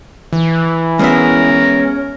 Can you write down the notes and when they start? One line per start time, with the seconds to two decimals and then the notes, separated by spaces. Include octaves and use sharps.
0.33 E3
0.99 G#3 B3 C#4 A#4 E5